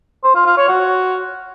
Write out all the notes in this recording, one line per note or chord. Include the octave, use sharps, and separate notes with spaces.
C5
F4
F4
C#5
F#4